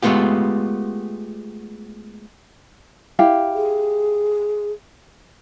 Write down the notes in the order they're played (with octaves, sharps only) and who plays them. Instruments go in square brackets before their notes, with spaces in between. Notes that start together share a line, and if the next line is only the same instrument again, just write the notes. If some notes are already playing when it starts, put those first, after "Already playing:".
[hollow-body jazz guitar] G#3 A3 B3 F4 G4
[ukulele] E4 G4 F5
[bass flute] G#4